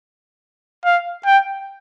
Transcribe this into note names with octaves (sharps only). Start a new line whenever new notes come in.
F5
G5